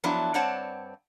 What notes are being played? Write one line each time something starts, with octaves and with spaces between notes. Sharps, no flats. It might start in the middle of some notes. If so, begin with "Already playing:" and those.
F3 F#3 B3 D4 E4
G2 C4 C#5 D5 F#5 A5